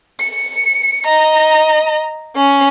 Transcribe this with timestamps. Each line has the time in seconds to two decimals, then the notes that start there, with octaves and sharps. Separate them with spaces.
0.21 C#7
1.07 D#5 A#5
2.36 C#4